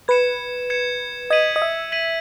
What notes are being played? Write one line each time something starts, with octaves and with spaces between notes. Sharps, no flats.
B4 G#6 C#7 E7
G#6 C#7 E7
D#5 G#6 B6 D#7 F#7
D#5
E5
G#6 B6 D#7 F#7